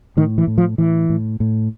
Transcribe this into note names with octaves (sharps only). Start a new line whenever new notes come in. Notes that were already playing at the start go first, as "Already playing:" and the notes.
A2 D#3
E3
A2
F3
A2 E3
A2
A2